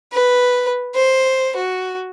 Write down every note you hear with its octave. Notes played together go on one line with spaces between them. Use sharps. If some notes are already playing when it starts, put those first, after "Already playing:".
B4
C5
F#4